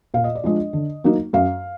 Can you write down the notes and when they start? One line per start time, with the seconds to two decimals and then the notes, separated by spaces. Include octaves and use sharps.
0.14 A#2 F5
0.24 D#5
0.35 D5
0.44 F3 G#3 D4 D#5
0.73 D3
1.04 F#3 A#3 D#4
1.33 F#2 F5